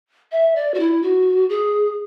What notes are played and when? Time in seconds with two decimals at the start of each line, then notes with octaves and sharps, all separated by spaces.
0.32 E5
0.56 D5
0.74 F#4
0.80 E4
1.03 F#4
1.49 G#4